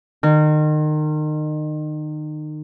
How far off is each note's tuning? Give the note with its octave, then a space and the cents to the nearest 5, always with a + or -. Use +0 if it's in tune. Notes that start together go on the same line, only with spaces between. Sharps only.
D#3 -30